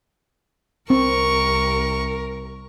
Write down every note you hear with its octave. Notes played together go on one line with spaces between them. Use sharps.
C2 C4 A#4 C#6